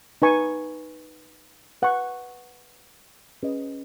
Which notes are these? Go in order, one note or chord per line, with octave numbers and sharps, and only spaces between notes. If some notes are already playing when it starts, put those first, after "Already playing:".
D#4 B4 G#5 C#6
B4 F#5 C#6
C#4 G#4 B4 D#5